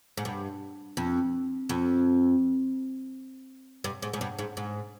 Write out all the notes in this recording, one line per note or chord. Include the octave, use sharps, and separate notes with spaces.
G#2
G2
F2
F2
G2
G#2
G#2
G2
G#2
G#2